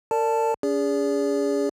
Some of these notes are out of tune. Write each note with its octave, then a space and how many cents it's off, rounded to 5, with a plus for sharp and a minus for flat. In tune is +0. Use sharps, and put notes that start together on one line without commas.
A#4 -35 D5 +0 A5 +0
C#4 +40 G#4 -20 D5 -30